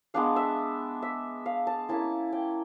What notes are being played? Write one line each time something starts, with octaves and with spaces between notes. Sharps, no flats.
G#3 B3 D4 F5
E5
E5
F5
A5
A#3 C#4 E4 A5
G5